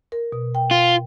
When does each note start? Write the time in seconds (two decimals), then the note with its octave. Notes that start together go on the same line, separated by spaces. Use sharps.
0.12 A#4
0.32 B2
0.55 G5
0.71 F4